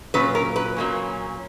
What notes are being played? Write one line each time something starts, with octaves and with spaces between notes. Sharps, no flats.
A#2 F#3 C#4 B4
A#4
B4
A#2 F#3 A#3 C#4